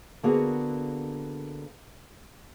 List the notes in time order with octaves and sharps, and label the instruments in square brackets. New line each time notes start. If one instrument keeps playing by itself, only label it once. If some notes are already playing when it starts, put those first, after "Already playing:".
[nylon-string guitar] D3 A#3 B3 F#4 G#4 A#4